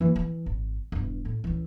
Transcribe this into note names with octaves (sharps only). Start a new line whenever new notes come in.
E3 A#3
E3
G#1
E1 G2
A2
C#2 E3